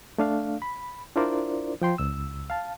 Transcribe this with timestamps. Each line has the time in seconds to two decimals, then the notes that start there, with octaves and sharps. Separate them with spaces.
0.18 A3 D4 F5
0.62 B5
1.16 D4 E4 F4 A#4 C5 D5
1.82 F3 G5 C6
1.98 C#2 E6
2.50 F5 A5